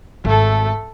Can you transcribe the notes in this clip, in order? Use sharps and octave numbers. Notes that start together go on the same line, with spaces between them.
G#1 A3 A4